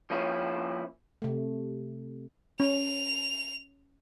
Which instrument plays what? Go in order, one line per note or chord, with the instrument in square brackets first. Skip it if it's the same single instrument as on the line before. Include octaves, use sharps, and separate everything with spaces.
[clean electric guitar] F3 A#3 C#4 E4
[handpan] C3 A3
[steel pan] C#4 [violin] F7